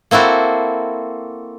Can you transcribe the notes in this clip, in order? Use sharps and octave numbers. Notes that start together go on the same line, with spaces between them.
A#3 C4 E4 F#4 A4